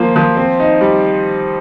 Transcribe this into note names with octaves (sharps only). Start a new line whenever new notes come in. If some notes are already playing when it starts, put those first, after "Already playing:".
Already playing: F3 A#3 F4
F3
C4
D#4
G3